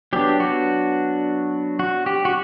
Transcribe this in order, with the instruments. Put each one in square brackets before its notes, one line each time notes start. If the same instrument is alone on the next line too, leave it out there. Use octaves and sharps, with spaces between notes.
[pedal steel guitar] F#3 B3 D4 G4
F#4
F#4
G4
F#4